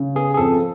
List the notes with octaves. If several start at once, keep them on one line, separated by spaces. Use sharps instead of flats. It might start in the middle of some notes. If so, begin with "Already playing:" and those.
Already playing: C#3
B3 G#4
G#4
F2 A4